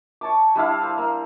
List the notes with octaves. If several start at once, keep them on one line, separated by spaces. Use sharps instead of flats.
C#5 A5 D6
G3 D4 E4 F5
C5
A#3